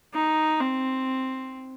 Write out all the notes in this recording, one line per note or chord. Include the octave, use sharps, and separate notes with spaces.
D#4
C4